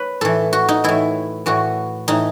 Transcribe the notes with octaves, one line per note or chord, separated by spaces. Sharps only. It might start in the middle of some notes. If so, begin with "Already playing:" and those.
Already playing: B4 C#5
A2 E3 A4
F#4
D#4
A2 E3 E4
A2 E3 F#4
A2 E3 D#4